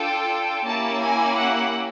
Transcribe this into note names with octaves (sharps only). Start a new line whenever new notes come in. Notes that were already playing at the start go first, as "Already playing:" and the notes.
Already playing: D4 F4 A4 G5
A#3 C#4 E4 G4 A5
G#5
F#5